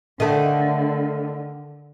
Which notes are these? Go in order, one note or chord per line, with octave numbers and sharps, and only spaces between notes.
D3 D#3 A3